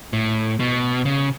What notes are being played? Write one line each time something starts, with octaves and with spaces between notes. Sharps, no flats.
A2
B2
C#3